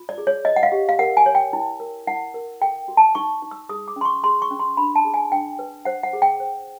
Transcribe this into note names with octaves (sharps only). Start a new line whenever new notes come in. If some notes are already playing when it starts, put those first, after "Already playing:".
Already playing: F4
D5
G#4
C#5
C#5 D#5
F#5
F5
G4
F5
A#4 F#5
G#5
C#5
G5
E4
A#4
E4 F#5
A#4
A4 G5
F#4
A5
D#4 C#6
D#4
E6
G#4 D#6
D6
C#4
C6
C#6
G#4 C6
C#6
C#4
C6
D4 B5
A5
G#4
G#5
D4 G5
B4
C5 F#5
F#5
G#4
G5
C5